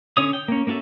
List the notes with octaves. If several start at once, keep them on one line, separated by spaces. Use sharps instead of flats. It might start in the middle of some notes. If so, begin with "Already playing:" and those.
D3 C#4 C#5 D#6
G5
A#3 C#4
A#3 C#4 F#4 A4 E5